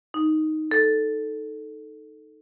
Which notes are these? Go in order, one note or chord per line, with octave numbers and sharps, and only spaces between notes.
D#4
A4